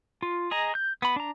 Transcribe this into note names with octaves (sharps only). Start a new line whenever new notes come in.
F4
G#4 D#5 A#5
G6
B3 B5
D4 A#5